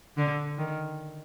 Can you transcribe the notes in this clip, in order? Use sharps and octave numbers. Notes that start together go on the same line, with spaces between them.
D3
D#3